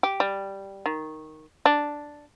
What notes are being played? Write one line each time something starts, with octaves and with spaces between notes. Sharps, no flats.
G4
G3
D#3
D4